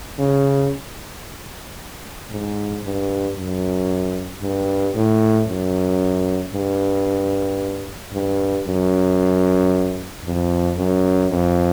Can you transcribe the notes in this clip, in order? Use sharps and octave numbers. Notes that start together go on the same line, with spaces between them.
C#3
G#2
G2
F#2
G2
A2
F#2
G2
G2
F#2
F2
F#2
F2